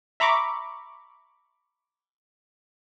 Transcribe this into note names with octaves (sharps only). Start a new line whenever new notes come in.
E5 A#5 B5 C#6 D6